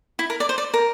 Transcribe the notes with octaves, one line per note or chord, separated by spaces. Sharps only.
E4
A#4
D5
C5
D5
A#4